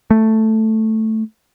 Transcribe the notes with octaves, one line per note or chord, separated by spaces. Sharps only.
A3